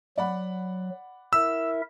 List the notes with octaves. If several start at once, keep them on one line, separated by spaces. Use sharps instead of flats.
F#3 D5 F#5 B5
E4 A#4 E5 E6